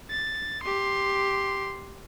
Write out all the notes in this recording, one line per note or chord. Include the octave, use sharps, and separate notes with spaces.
A6
G4 C6